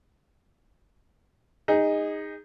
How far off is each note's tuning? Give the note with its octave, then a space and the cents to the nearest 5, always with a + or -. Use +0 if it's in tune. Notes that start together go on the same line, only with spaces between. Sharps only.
D#4 +0 G#4 -25